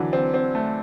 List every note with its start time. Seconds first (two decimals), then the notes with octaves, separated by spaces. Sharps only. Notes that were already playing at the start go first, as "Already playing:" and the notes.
Already playing: D3 E3 F#3
0.13 C4
0.34 C4
0.55 A3